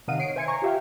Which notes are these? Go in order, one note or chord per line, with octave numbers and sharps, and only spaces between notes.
C3 D#3 D#5 F5 F#5 D#7
C#5 C7 D7
C5 E5 G#5 G#6 C#7
G#5 A#5 C#6
F4 G4 E5 F5 G5